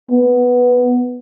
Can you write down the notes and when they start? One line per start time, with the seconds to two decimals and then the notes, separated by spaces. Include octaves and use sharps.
0.11 B3